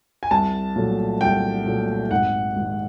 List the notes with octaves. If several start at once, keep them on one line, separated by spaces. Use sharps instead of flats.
G#5
C2 A5
A#2 F#3 A3
C2 G5
A#2 F#3 A3
G#1 F#5
G#2 D#3